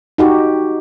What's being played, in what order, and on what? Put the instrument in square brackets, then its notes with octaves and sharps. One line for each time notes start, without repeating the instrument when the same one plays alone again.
[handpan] D#4 F#4 G4